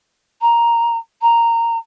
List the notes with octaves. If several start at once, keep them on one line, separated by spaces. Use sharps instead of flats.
A#5
A#5